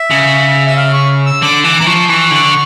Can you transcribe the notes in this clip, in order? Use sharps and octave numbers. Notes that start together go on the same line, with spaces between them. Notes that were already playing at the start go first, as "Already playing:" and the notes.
Already playing: E5
C#3
E5
F5
C#6
E6
D3 D6
E3 D6
E3 A#5
F3 C#6
E3 C#6
D3